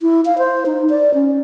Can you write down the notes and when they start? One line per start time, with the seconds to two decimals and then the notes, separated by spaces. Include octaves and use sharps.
0.02 E4
0.25 F5
0.38 C5
0.66 D#4
0.90 D5
1.14 C#4